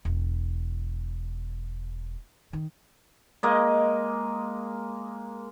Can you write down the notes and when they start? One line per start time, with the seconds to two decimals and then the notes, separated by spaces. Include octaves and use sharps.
0.05 E1
2.53 D#3
3.43 G#3 A#3 D#5